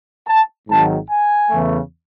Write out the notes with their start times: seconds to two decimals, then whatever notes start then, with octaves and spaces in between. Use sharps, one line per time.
0.27 A5
0.69 G#1 G#2 D#3 F#3 A5
1.09 G#5
1.50 E2 C#3 E3 A3